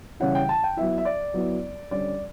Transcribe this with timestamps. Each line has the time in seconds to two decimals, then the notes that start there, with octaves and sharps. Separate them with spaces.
0.20 C#3 E3 G3 C#4 E4 F#5
0.35 G5
0.49 A5
0.64 G5
0.77 F#3 B3 E4 E5
0.98 E5
1.05 D5
1.34 F#3 B3 E4
1.91 D3 G3 C#4 D5